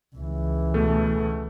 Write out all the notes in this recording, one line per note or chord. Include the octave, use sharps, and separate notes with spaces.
C#2 E3
B2 A3 A4